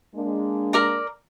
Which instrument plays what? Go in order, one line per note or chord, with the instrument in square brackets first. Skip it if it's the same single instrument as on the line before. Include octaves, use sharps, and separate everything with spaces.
[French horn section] G#3 A#3 D4
[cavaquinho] A#4 D5 A#5